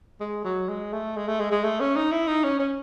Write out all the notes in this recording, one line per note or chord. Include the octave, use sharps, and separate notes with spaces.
G#3
F#3
G#3
A3
G#3
A3
G#3
G#3
A3
C#4
D#4
E4
D#4
C#4
C#4